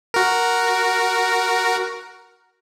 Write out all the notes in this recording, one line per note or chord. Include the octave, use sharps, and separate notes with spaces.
F#4 A#4